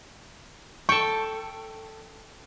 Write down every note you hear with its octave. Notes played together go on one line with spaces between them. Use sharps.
A4 G5 C#6